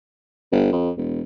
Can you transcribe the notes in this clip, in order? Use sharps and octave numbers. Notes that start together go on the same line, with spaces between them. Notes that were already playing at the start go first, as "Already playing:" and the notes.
G1
F2
E1